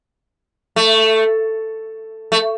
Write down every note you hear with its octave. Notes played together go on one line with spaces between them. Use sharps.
A3
A3